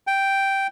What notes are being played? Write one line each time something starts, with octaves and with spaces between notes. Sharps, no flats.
G5